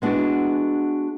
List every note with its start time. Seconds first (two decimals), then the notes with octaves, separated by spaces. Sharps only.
0.02 G#3 B3 D4 E4 F#4 G#4